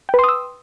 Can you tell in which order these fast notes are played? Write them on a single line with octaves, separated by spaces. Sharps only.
G5 B4 C6 D#6 E6